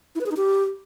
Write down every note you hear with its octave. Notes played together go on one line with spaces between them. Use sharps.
E4
B4
G#4
D#4
G4